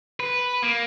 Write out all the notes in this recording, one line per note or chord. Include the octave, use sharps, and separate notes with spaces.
B4
A#3